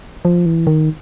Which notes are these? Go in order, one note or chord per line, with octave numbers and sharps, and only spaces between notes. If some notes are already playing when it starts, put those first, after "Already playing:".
F3
E3
D#3